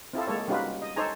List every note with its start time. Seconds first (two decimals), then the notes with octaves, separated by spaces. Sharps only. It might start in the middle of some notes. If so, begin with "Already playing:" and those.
0.13 C4 E4 F4 A4
0.27 G#3 A#3 A4 C#5
0.48 G3 C#4 D#4 F4 F#4 B4
0.82 D#5
0.96 D#4 A4 C5 C#5 G#5 A#5